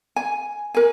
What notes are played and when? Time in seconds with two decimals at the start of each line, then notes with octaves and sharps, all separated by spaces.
0.16 G#5
0.74 A#4 G#5